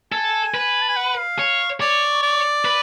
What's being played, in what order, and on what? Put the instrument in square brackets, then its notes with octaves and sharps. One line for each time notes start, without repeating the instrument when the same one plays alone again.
[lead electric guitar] A4 [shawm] G#5
[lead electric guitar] B4
[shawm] A5
G#5
F#5
F5
[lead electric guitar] C#5
[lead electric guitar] C#5 [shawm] D5
[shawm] D5
[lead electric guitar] B4